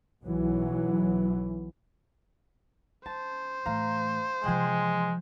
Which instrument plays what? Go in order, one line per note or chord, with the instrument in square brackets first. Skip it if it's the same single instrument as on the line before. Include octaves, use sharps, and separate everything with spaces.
[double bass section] B1 E3 F#3
[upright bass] C#4 [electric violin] C5 [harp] A5
[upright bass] A2 E3 [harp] F5 A#5
[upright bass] C3 E3 [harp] F3 G5 F#6 [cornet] G#3